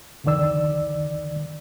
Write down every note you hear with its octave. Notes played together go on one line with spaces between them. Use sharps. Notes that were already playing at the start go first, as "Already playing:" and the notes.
C2 F2 D3 D#3 D5 E6